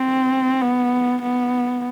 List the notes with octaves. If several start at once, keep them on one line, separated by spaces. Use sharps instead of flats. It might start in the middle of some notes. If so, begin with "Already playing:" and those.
Already playing: C4
B3
B3